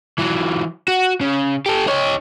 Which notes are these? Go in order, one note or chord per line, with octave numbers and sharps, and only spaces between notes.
E3 F#3
F#4
C#3
G4 A4
D#4 C#5